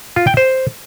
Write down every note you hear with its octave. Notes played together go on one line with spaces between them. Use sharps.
F4
G5
C5